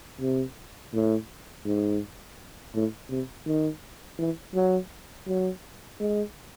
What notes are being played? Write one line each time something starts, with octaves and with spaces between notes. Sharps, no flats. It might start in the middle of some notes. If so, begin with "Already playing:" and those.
C3
A2
G#2
A2
C3
D#3
E3
F#3
F#3
G#3